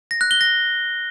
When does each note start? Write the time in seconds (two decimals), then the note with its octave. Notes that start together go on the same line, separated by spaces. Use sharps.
0.11 A#6
0.21 F#6
0.31 G7
0.41 A#6